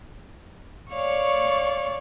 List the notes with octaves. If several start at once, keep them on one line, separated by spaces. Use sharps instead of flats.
C#5 D5 F5 C#6